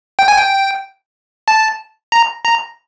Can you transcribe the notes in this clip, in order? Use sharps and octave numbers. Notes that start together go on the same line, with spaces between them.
G5
G#5
G5
A5
A#5
A#5